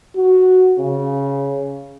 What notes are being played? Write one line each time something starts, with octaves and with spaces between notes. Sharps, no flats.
F#4
C#3